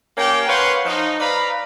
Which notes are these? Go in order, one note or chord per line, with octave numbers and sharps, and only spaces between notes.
A#3 C#4 G4 G5
B4 C#5 F5 F#5 C6
F3 D#4
B4 D5 F5 A#5 B5